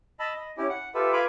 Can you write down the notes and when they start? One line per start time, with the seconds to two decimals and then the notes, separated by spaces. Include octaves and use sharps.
0.19 D#5 A5 B5 E6
0.35 D#5
0.57 C#4 E4 G4
0.69 F#5
0.94 F4 G4 A4 B4 E5
1.13 F4 B4 F5 G#5 B5 D6